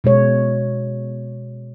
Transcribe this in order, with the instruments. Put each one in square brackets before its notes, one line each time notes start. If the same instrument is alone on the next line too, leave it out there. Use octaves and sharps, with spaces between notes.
[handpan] B2 G#3 C#5